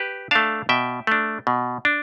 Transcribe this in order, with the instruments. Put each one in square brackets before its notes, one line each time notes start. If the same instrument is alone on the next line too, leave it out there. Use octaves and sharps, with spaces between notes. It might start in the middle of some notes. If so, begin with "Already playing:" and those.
Already playing: [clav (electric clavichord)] G4 B4
A3 D4 F5 A5
B2 E5 G5
A3 D4
B2
D4